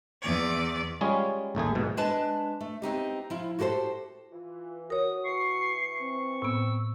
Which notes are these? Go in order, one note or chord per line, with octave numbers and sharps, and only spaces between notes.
E2 D5
G3 G#3 C#4 F4 G#4
A1 D#2 A3 G#4
G#2 B2
G#3 D4 B4 A5
A3
B3 C4 D#4 G4
F3 E4
F#4 G4 A4 B4 C5
E3 F4
F#4 A#4 C#5 D#6
E3 C#6 C7
C4
A2 B3 E6